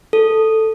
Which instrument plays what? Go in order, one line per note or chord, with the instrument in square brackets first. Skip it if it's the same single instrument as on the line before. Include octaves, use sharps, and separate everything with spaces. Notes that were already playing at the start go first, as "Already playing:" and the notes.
[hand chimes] A4